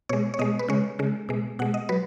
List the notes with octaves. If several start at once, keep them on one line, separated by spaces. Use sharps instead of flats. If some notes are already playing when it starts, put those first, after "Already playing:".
B2 G#3 C#5
C#5
B2 G#3 D#5
B4
C#3 G#3 C#5
C#3 G#3
B2 G#3
B2 G#3 F#5
D#5
F#3 B4